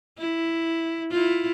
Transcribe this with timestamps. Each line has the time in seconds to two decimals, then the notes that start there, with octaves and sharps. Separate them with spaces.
0.18 E4
1.10 E4 F4